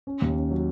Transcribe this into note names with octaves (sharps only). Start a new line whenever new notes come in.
C#4
D#2
C#4
F#3